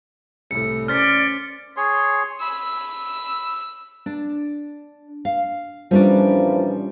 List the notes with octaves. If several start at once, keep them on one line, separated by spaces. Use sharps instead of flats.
C2 A2 C#7
C#4 A#4 C5 D5 F6 A6 B6
G#4 C#5 C6
B5 E6
D4
F5
A#2 E3 F3 G3 C#4 D4